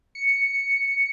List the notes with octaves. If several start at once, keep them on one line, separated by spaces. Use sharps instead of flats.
C#7